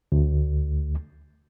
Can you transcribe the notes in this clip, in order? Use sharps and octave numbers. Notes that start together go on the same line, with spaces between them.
D2